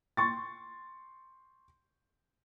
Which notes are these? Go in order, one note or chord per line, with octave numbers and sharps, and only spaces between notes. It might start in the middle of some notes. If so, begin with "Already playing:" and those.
C6 C#6 A6